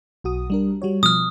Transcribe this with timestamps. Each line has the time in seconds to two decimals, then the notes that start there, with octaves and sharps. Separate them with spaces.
0.24 B1 F#4 D#6
0.50 G3 D4 A#4
0.82 G3 F#4 C#5
1.03 B2 F3 D#6 F6